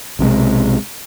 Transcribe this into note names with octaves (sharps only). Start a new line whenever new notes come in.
B1 C3 F3 G#3